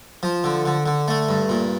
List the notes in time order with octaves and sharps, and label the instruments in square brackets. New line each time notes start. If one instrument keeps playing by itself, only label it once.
[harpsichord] F3
D3
D3
D3
A3
G2
A#2